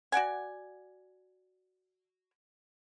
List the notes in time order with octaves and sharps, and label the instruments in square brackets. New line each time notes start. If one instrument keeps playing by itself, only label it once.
[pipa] F#4 D5 F#5 G#5